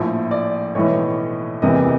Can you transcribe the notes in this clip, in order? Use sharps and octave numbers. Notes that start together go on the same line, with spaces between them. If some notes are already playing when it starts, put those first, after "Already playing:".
Already playing: A#1 A2 F3 A3
D5
B1 A2 E3 C#5
F#1 E2 C3 E3 D#5